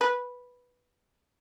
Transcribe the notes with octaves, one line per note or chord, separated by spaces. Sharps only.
B4